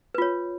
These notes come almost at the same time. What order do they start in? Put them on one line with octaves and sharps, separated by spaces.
B4 F4 C#5